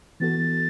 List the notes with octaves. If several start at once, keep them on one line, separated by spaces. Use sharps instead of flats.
E3 B3 F#4 A4 A6